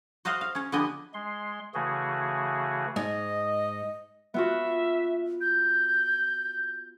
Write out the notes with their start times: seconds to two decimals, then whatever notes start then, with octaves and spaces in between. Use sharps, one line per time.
0.25 F#4 C5 D#5 F5 F#5
0.41 F5
0.55 C#4 C#5
0.72 D3 F3 B3 G4 D#5 G#5
1.14 G#3 C6
1.74 C#3 E3 A3 F#4 G#4
2.96 G#2 D#5
4.34 B3 F4 F#4 E5
5.41 G6